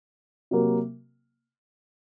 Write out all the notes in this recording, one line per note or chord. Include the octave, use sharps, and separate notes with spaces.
C3 F#3 A#3